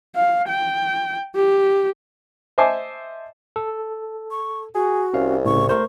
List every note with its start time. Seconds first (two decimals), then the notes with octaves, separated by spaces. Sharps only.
0.16 F5
0.49 G5
1.36 G4
2.58 C5 D#5 E5 G#5 A5 D6
3.56 A4
4.31 C#6
4.75 F#4 G#4
5.13 C2 C#4 F5
5.45 A2 C#3 C#6
5.69 A3 A#4 C5 C#6